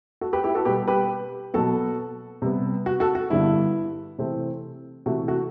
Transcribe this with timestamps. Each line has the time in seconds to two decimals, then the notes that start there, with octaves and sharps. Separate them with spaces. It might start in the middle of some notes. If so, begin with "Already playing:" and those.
0.21 F#4 A4
0.33 G4 B4
0.44 E4 G4
0.55 F#4 A4
0.65 B2 G3 B3 G4 B4
0.88 G4 B4
1.54 B2 F#3 B3 F#4 A4
2.42 C3 G3 B3
2.86 F#4
3.00 F#4 A4
3.15 F#4
3.30 G2 D3 G3 B3 E4
4.19 C3 E3 A3 C4
5.06 C3 E3 A3 F#4
5.28 F#4 A4